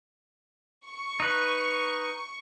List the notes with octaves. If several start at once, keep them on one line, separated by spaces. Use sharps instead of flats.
C#6
D#4 B4